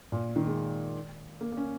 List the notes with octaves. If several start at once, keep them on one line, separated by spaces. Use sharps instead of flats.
A#2
D#3
G#3
A#3
A#3
C#4